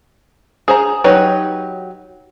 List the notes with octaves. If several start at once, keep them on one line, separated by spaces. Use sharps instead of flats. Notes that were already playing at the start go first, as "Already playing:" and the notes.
G#4 C5 A#5
F#3 D#4 G4 B4 C#5